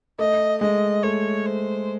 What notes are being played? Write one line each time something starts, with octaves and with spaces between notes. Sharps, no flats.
A3 D#5
G#3 D#5
A3 C#5
C5